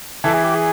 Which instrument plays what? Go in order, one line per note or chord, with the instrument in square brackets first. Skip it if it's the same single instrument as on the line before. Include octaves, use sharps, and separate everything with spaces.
[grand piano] E3 E4 [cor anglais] A4
[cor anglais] G#4
G4
G#4